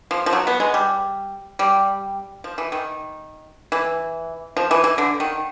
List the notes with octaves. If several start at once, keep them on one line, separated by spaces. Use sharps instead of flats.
F3
F3
F#3
B3
G#3
G3
G3
F3
E3
D#3
E3
F3
E3
E3
D3
D#3